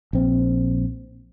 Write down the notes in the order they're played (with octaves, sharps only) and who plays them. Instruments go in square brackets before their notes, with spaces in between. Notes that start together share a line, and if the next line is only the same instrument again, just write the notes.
[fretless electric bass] A#1 C4